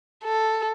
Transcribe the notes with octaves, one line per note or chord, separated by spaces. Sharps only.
A4